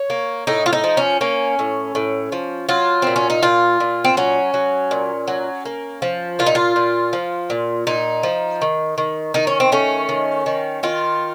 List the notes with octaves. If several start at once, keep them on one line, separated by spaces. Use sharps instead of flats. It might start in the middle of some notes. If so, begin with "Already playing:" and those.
Already playing: C#5
A#3
A2 D#4
F4
D#4
F3
C#4
A#3 C#4
A2
A2
F3
F#3 F4
A#2 C4
C#4
D#4
A#2 F4
A#2
C4
F#3 C#4
F#3
A#2
F#3
A#3
F3
A#2 F4
D#4
F4
A#2
F3
A#2
A#2 D#4
F3
D#3
D#3
D#3 D#4
C#4
C4
A3 C#4
D#3
D#3
D#3 F4